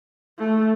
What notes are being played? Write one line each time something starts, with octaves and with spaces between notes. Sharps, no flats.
A3